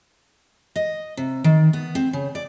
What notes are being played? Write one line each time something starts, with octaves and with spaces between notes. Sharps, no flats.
D#5
C3
D#3
B3
C4
C#3
D5